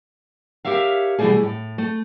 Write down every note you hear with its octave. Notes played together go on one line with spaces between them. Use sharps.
G4 A#4 C#5 E5 F5
B2 E3 F#3 G3 A3 G#4
A2
A3